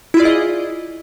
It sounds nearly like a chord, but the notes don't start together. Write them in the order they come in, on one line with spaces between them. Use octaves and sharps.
E4 F4 D5 G#4 D#5